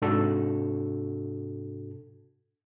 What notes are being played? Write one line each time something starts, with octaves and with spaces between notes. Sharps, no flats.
G#2 C3 D4 F#4 A4